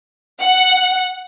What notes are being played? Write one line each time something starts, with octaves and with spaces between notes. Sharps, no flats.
F#5